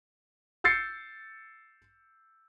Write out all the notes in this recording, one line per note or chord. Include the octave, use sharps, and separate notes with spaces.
E6 G6 A6 C7 C#7